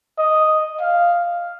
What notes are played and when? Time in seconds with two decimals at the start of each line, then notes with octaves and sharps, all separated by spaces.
0.19 D#5
0.81 F5